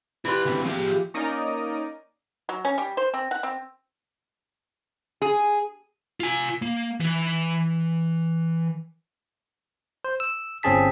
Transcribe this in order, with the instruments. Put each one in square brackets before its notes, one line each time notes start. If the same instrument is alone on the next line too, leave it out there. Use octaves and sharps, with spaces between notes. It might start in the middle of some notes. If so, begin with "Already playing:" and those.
[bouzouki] E3 G3 B4 [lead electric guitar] E4 C6
[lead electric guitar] D2 C4
[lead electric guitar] F3 G#4 [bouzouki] F4 G4
[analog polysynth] A#3 C#4 D#4 A#4 D5 D#5
[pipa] F#3
C#4
G3
C5
C4
F#5
C4
[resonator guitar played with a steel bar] G#4
[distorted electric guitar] F4 G#5
A#3
E3 B4
[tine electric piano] C5
E6
G1 C4 C#4 G#4 A5 B6